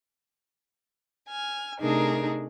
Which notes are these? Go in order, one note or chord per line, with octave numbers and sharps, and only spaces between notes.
G#5 F6
C3 A3 D4 D#4 G#4 A#4